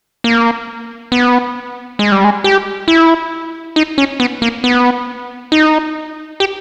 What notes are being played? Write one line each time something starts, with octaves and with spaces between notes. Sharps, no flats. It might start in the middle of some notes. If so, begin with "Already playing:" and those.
A#3
B3
G#3
G3
G#3
G4
E4
D#4
C#4
B3
A#3
B3
D#4
G4